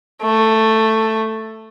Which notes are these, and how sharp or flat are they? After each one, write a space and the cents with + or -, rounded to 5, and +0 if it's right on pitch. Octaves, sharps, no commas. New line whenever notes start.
A3 +10